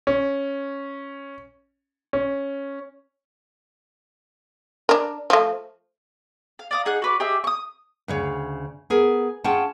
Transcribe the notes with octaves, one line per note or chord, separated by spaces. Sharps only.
C#4
C#4
D4 A#4
F3 A3
F5
D5 F5 D#6
D#4 G#4 F#5 F#6
F#4 B4 D5
G4 G#4 D#5 E5
C#6 D#6
D2 C#3 C#5
B3 G#4 A#4
C#4 F4 G#4 F#5 G5 A5